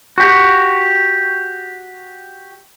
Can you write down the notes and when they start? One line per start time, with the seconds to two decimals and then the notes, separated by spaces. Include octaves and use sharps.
0.18 F#4 G4